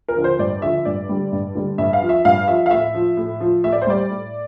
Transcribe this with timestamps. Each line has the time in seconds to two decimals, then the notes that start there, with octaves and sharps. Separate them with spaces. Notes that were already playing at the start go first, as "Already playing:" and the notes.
0.08 A#4
0.16 D3 F3
0.24 C5
0.39 G2 D5
0.62 D3 F3 E5
0.85 G2 D5
1.09 D3 G3
1.32 G2
1.55 D3 G3
1.78 G2 E5
1.93 F5
2.01 F3
2.09 E5
2.25 G2 F5
2.48 F3 E5
2.66 F5
2.71 A2 E5
2.95 F3
3.17 A2
3.40 F3
3.63 A2 E5
3.72 D5
3.82 C5
3.87 G3 D5
4.09 A2